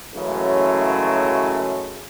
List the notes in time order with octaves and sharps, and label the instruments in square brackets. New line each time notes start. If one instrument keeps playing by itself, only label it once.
[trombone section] F#2 C#3 E3 F#3 G#3 A3